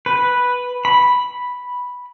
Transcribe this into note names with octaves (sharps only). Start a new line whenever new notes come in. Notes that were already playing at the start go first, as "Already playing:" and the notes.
B4
B5